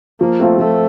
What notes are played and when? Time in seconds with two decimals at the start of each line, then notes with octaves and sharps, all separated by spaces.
0.20 F3 A#3
0.39 A3 C4 F4
0.58 F3 A3